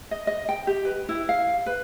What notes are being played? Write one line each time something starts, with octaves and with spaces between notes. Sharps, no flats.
D#5
D#5
G5
G4
B4
E4
F5
B4